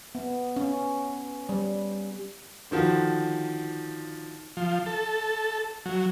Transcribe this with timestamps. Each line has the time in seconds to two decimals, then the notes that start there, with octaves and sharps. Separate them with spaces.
0.15 B3
0.56 C#4
1.49 G3
2.71 D3 D#3 F3 F#4
4.57 F3
4.86 A4
5.86 F#3